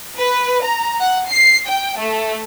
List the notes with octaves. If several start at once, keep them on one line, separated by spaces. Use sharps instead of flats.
B4
A#5
F#5
C7
G5
A3